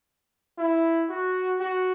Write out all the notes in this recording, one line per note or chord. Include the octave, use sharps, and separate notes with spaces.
E4
F#4
F#4